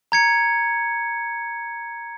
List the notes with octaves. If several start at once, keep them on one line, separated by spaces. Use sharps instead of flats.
A#5 G#6 C#7